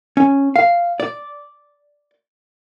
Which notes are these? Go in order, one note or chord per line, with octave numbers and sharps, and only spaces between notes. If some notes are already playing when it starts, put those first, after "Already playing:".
C#4
F5
D5